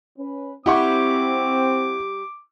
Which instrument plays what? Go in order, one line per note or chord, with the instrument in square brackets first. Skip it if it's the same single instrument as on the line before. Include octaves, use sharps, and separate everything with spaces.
[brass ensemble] C#4 B4
[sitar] G3 G4 [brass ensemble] C4 [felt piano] E4 F#5 C#6 [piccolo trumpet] D6